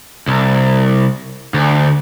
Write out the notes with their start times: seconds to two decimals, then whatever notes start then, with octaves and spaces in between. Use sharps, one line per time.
0.28 C2
1.54 D2